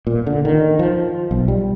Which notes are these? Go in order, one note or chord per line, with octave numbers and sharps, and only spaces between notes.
A#2
D3
D#3
F3
B1
G3